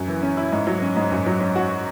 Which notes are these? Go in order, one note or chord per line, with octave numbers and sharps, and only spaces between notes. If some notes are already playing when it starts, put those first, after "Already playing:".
Already playing: F#2
E3
C#4
E4
G#2
F#3
C#4
G#2
F#2
F#3
C#4
F#4